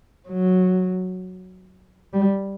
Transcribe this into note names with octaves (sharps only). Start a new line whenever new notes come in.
F#3
G3